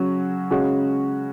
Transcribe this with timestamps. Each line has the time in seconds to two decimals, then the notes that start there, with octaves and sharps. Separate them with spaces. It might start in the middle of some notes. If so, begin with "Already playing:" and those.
Already playing: C#3 F#3 C#4 F#4
0.51 C#3 G#3 C#4 F#4